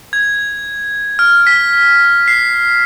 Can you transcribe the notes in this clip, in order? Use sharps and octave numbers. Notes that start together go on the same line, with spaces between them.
G#6
F6
B6
C7